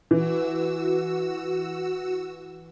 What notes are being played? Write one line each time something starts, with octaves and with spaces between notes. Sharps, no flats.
E3 F#4 E6